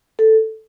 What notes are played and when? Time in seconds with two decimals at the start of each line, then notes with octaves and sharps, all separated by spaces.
0.19 A4